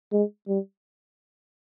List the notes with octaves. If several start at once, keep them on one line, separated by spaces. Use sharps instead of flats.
G#3
G3